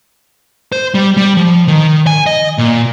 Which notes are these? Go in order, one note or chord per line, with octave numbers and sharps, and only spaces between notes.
C5
G3
G3
F3
D#3
G#5
D#5
A#2